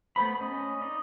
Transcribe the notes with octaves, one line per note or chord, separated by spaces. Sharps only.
A3 B3 C5 B5
C#4 D#5
D#4 D5 D#5